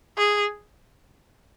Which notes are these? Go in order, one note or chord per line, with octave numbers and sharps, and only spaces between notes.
G#4